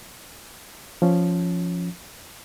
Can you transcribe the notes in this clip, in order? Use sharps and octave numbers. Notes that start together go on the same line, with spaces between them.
F3 C#4